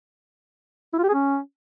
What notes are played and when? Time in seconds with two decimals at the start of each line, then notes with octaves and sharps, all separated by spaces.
0.93 E4
0.98 F4
1.04 G4
1.09 G#4
1.14 C#4